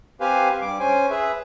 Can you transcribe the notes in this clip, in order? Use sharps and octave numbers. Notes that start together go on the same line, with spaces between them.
C4 G4 B4 C5 F5 G#5
G2 G3 D6
C#4 C5 G#5
G#4 B4 E5